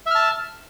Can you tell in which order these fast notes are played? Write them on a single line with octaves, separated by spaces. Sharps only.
E5 F6 A5